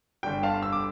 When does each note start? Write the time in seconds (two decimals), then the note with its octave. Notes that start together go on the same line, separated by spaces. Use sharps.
0.23 G1 G2 D3 G3 G5
0.43 F5 A5
0.63 E6
0.73 D6